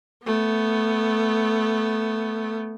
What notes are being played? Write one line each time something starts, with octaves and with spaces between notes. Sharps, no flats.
A3 B3